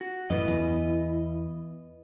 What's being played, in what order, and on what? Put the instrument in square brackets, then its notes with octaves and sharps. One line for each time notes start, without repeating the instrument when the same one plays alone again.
[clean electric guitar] F#4
[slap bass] F#2 A2 E3 [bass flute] E4 [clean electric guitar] B4 D#5
[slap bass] E2